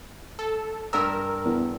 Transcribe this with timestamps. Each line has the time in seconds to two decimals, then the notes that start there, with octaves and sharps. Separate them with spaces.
0.39 A4
0.93 G2 A#4 E6
1.45 E2